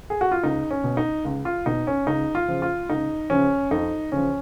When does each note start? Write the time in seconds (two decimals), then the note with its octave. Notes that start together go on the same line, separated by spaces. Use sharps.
0.10 G#4
0.21 F#4
0.32 F4
0.43 C#2 D#4
0.71 C#4
0.84 B2
0.97 D#4
1.25 C#2
1.45 F4
1.66 B2 D#4
1.87 C#4
2.07 C#2 D#4
2.35 F4
2.48 C#3 F3
2.62 F4
2.89 C#2 D#4
3.30 C#3 F3 C#4
3.71 F2 D#4
4.12 C#3 F3 C#4